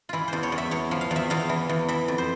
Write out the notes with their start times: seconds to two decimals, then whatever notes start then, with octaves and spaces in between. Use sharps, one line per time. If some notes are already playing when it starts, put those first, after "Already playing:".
0.09 E3 E4 F4
0.28 E2 C5
0.43 C#5
0.52 E2
0.58 E5
0.71 E2 C#5
0.91 F3
1.01 F5
1.11 E2
1.16 E5
1.30 E2 F5
1.49 E3
1.69 E2
1.88 E3 E5
2.08 F2
2.18 C5